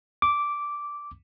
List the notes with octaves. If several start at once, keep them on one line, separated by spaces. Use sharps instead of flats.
D6